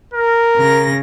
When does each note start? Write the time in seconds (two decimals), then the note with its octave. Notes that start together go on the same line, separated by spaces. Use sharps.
0.14 A#4
0.57 C#3 A#6